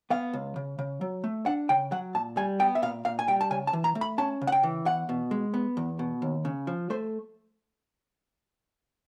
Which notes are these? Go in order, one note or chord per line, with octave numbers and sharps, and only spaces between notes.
B3 F5
C#2
C#3
C#3
F#3
A3
D4 F#5
C#3 G5
F#3 F#5
A#2 A5
G3 G#5
B3 G5
E5
A#2 F5
A#2 F5
G#5
G3 G5
A5
C#3 G#5
A5
E3
A#5
A3
B5
C#4 A5
C#3
F#5
G5
E3
E2 F#5
B2
G#3
B3
E2
B2
D#2
C#3
F3
A3 C5